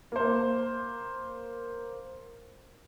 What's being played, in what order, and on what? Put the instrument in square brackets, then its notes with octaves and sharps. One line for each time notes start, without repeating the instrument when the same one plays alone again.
[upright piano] A#3 C5